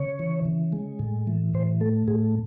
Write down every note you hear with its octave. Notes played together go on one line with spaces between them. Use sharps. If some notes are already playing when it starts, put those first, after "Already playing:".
Already playing: C#3 C#5
E3
C#3
G#3
A2
E3
A2 C5
A3 A4
A2 G#4